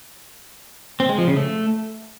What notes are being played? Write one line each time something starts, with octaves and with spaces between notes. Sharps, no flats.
C4
G#3
F3
C#3
A3